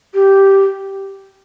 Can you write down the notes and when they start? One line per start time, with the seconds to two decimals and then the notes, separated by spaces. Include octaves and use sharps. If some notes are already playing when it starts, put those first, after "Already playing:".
0.14 G4